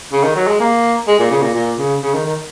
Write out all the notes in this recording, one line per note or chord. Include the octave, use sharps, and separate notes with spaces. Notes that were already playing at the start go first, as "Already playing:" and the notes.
C#3
D#3
F#3
G#3
A#3
G#3
A#2
C#3
A#2
A#2
C#3
C#3
D#3
D#3